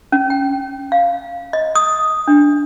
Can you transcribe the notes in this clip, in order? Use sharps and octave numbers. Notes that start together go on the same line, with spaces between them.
C#4
G5
F5
D#5
D#6
D4